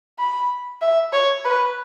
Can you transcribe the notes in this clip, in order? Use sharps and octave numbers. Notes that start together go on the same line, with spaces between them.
B5
E5
C#5
B4